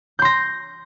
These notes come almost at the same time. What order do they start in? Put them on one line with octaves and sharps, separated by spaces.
G6 C6 A#6